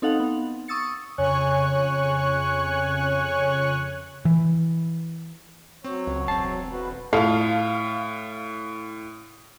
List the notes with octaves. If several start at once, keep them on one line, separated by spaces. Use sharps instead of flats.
C4 D#4 A4 F5 F#5
B3
C#6 D#6 E6 A6 C#7
F2 C#3 C#5 G#5 C#6 F#6
E3
F#3 C4 C#5
C#2
E1 C4 A5 C7
F#4 B4
A2 F4 A4 F5